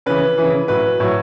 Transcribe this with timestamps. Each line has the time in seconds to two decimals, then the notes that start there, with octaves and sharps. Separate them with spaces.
0.06 C#3 E3 B4
0.38 C#3 E3
0.68 A2 F#3 B4
1.00 A2 F#3